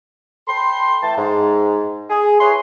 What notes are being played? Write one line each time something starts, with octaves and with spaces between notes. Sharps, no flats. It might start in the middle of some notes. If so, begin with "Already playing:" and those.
A4 G5 B5 C6
E3 A3 G5 A5
G#2
G#4
E4 G#4 B4 C#5 C6